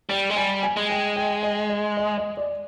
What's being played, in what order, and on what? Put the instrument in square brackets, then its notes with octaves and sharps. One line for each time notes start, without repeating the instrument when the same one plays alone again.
[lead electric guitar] G3 [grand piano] G5
[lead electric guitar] G#3
[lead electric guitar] G3 [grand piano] G#5
[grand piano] G#5
[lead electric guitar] G#3
[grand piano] G5
G5
D#5
D#5
D#5
D#5
D5